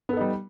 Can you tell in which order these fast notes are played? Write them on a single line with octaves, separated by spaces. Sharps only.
B3 A4 D#4 G3